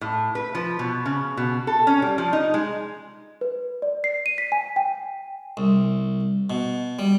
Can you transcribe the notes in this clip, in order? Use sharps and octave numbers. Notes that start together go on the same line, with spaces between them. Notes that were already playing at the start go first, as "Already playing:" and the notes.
A2
B4
F3
B2
C#3
B2
A4
C#4
G3
F3
D#4
G#3
B4
D5
C7
D#7
B6
G#5
G5
C2
B2
G3